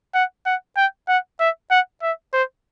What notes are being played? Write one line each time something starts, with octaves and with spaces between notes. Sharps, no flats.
F#5
F#5
G5
F#5
E5
F#5
E5
C5